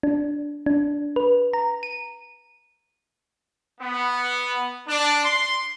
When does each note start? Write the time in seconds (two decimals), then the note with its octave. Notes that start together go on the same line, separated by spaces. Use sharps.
0.03 D4
0.66 D4
1.16 B4
1.53 A#5
1.83 D#7
3.81 B3
4.87 D4
5.24 C6